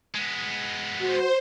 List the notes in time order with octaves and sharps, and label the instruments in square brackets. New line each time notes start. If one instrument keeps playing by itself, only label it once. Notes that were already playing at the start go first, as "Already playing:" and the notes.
[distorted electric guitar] G#3 B3
[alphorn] F#4 [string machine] C5